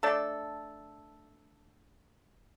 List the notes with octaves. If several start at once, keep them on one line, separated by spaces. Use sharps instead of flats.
A3 D4 A4